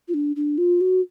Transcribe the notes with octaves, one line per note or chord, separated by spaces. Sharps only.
F4
D4
D4
F4
F#4